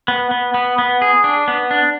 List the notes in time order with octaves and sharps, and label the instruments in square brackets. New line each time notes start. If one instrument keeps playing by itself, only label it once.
[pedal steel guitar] B3
B3
B3
B3
G#4
D4
B3
D4